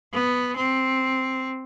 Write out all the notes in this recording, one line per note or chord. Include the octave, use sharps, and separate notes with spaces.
B3
C4